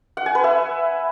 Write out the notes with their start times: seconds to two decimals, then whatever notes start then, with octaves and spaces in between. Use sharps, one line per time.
0.17 F#5
0.26 G#5
0.35 B4
0.44 E5